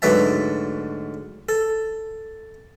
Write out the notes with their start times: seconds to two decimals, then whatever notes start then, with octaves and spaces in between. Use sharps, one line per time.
0.02 D2 G#2 F#3 B4 E5 A5
1.49 A4